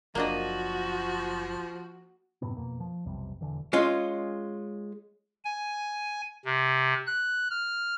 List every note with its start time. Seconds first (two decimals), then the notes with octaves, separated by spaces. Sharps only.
0.15 F#1 F3 A#3 D4 F#4 D#5
2.42 F#2 A2 C3 B3
2.57 F2 B2 A#3
2.80 F3
3.06 B1 F2 C3 G3
3.41 E1 D#2 D3 E3
3.73 G#3 C#4 F4
5.45 G#5
6.45 C3
7.07 F#6
7.50 F6